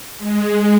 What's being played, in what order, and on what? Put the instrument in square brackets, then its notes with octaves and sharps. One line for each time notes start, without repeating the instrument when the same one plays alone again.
[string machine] G#3